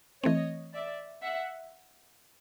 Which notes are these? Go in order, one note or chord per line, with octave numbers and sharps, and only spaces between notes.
E3 A3 C4 C#5 D#5
D5 E5
E5 F#5